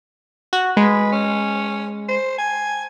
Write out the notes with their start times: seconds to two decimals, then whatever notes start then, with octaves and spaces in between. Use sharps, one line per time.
0.53 F#4
0.77 G#3 B4
1.12 C#4
2.08 C5
2.38 G#5